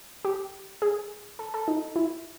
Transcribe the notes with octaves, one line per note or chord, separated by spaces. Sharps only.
G4
G#4
A4
A4
D#4
E4